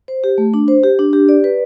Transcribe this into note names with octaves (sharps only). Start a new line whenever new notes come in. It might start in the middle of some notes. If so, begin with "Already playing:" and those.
C5
G4
A3
D4
C5
G4
D4
G4
D5
B4